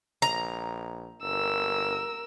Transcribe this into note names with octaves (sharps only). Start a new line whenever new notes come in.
A#1 A#5
G1 A#4 E6